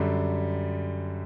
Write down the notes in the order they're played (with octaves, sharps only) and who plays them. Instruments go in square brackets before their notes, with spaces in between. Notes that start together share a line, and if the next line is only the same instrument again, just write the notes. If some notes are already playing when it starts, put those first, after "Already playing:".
Already playing: [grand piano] F#2 D3 G3